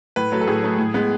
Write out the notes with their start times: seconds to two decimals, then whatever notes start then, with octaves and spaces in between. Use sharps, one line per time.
0.16 A2 B4
0.32 F#3 A3
0.41 A4
0.47 A2 G#4
0.63 F#3 A3
0.79 A2
0.94 G#3 B3